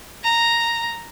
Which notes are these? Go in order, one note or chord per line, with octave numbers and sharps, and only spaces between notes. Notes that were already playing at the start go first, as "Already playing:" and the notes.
A#5